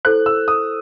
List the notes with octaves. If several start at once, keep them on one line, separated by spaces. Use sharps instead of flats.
E4 A4 C5 F#6
E6
D#6